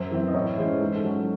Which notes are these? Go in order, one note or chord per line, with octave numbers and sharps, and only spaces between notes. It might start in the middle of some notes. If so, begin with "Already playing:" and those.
Already playing: F#2 C5
E3 C4
D#5
A2 C#5
E3 G#3 C#4 C5
G#2 C5
A4
F#3 C#4